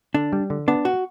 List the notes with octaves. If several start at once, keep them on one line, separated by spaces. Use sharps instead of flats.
D3 D4
G3
D3
B3 D4
F#4